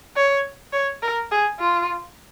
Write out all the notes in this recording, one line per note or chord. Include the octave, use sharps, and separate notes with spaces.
C#5
C#5
A#4
G#4
F4